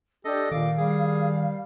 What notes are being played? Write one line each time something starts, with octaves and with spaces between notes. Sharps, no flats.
D4 G4 A4 D#5
A#2 D#3 F5 D6
G3 G#4